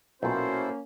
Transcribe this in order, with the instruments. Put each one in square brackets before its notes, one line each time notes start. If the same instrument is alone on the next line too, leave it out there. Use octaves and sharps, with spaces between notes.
[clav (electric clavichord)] B1 A#2 [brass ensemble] A#3 C#4 [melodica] E4 A4 [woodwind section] F#4 C5